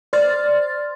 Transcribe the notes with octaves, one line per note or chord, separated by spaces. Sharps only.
C5 D5 C6 F6 A6